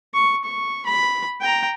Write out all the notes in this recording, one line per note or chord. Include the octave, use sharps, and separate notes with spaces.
C#6
C#6
B5
G5 A#5